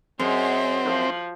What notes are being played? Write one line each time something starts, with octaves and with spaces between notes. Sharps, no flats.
F#2 C4 G#4 D#5
F3